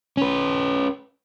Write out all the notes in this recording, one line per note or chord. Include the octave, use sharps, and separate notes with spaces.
C#4 B4